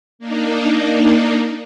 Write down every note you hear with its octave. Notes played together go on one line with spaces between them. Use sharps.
A#3 D4 D#4